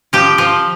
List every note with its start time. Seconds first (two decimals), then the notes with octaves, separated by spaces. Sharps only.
0.13 F3 G4
0.38 F3